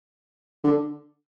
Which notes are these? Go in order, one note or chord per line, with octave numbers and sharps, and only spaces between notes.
D3